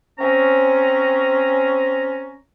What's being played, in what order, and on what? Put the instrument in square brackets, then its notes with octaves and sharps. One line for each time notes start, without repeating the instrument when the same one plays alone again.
[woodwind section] C4 C#4 A#5